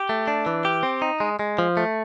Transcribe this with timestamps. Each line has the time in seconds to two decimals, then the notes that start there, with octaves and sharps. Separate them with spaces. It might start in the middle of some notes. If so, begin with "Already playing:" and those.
Already playing: G4
0.09 A3
0.28 D4
0.46 E3
0.65 G4
0.83 C4
1.02 D#4
1.20 G#3
1.39 G#3
1.59 F3
1.77 A3